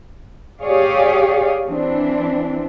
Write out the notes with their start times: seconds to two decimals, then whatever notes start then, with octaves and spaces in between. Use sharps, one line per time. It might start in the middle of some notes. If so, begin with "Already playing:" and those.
0.61 G4 G#4 C#5 D5 F5
1.66 E3 C4 D4